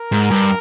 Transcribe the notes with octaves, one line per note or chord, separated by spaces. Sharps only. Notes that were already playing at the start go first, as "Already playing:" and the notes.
Already playing: A#4
G#2
G2